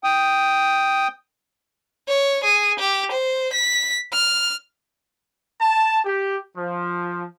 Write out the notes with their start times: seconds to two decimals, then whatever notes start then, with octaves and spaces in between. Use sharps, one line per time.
0.04 G5 D#6
2.08 C#5
2.43 G#4
2.79 G4
3.11 C5
3.53 B6
4.13 F6
5.61 A5
6.05 G4
6.56 F3